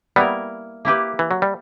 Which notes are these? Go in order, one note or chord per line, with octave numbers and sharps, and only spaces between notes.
G3 A#3 B3 E4 A#4
A#3 E4 G4 B4
E3
F#3
G3